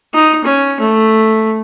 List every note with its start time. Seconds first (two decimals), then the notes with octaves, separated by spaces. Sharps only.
0.14 D#4
0.44 C#4
0.80 A3